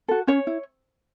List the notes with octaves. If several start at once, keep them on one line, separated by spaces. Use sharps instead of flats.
F#4 A4
C#4 C#5
E4